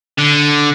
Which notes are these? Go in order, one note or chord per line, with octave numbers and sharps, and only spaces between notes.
D3